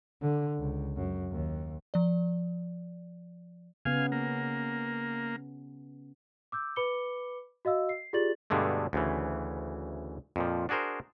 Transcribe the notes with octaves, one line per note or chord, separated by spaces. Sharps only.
D3
C#2
F#2
D#2
F3 D5
C#3 B3 F5 G#5
A#3
D6 E6 G6
B4 B5 D6 C#7 G7
F#4 D#5 F5 E6
C7
F4 G4 G#4 D5 A6 F#7
G2 B2 D3 G#3 A3
D2 C#3 E3
F2 A#2 F3
D4 F#4 G#4 A#4 C5